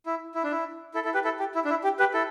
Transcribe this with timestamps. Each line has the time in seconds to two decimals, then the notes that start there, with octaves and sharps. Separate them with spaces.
0.06 E4
0.35 E4
0.44 D4
0.51 E4
0.94 E4 A4
1.04 E4 A4
1.14 G4 B4
1.24 E4 A4
1.39 G4
1.55 E4
1.65 D4
1.70 E4
1.84 G4
1.99 G4 B4
2.14 E4 A4